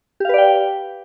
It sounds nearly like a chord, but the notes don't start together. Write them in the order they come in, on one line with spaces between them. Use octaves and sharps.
G4 F5 B4 D5 G5